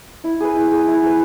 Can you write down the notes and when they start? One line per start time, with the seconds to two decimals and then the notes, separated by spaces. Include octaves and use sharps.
0.24 E4
0.40 G#4 B4
0.56 E4
0.72 G#4 B4
0.87 E4
1.03 G#4 B4